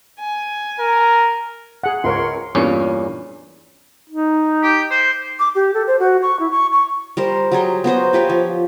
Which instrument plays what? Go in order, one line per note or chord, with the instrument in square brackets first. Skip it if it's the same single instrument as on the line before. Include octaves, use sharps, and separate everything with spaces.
[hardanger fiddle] G#5
[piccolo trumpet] A#4
[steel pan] G#4 F#5
[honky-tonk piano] C#2 A#4 C#7 [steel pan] F4 C#5 [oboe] C6
[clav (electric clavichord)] E2 G2 A#2 C#4
[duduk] D#4
[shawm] G4
C5
[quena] D6
G4
A4
C5
F#4
C#6
E4
C#6
C#6
[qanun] G3 A#4 C5
F#3 G3 G#4 C6
B3 F#4 C5 A#5
F4 G4 B4 C#5
F3